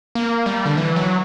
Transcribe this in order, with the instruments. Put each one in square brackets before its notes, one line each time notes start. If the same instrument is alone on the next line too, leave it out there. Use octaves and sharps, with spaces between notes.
[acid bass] A#3
G3
D3
E3
F#3